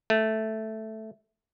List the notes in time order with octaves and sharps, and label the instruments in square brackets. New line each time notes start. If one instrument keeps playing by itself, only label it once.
[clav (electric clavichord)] A3